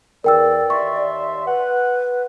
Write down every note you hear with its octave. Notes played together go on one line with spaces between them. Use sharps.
E2 A#4 D5 G5 E6
D#2 E5 C6 C#6
B4 F#5